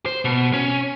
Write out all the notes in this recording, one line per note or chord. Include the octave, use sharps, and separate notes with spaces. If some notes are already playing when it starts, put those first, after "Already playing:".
C5
B2
C#4